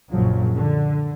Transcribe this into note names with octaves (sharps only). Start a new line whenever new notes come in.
A#1 F#2 A#2 C#3 F3 F#3
D3